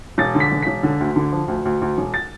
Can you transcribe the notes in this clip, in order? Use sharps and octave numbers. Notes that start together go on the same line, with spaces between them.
E1 A6
D3
B6
E1
E1 B6
D3
D2
D3
F3
D2
D2
D2
E1
A6